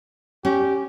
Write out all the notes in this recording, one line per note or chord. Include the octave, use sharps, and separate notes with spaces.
C#4 G4